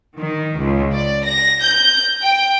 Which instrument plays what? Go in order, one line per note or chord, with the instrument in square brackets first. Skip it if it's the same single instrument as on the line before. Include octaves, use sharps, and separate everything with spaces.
[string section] D#3
C#2
D5
A#6
G6
G5